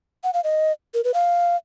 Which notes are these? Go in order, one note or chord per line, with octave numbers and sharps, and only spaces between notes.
F#5
F5
D#5
A#4
B4
F5